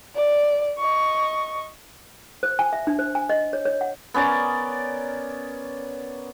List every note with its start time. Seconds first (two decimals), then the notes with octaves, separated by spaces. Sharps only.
0.16 D5
0.78 D#5 C#6
2.43 C5
2.59 G#5
2.73 E5
2.87 D4
2.99 C5
3.15 G#5
3.30 D#5
3.53 C#5
3.65 C#5
3.81 F#5
4.14 B3 C#4 A#4 D5